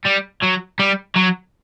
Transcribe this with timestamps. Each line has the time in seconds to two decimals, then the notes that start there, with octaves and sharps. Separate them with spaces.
0.05 G3
0.42 F#3
0.79 G3
1.16 F#3